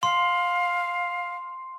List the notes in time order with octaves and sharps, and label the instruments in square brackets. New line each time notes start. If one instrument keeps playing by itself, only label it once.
[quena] F5 [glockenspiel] C6